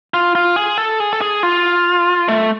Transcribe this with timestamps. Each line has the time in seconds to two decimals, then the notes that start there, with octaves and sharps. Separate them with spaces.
0.14 F4
0.35 F4
0.56 G#4
0.78 A4
1.00 G#4
1.13 A4
1.21 G#4
1.43 F4
2.28 A3